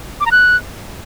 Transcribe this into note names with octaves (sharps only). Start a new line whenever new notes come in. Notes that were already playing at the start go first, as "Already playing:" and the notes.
D6
A#5
F#6